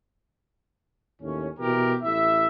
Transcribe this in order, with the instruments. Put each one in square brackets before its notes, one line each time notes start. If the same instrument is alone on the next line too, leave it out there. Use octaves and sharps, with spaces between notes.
[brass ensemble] D#2 A2 C#4
B2 E3 G4 A#4
A1 E4 E5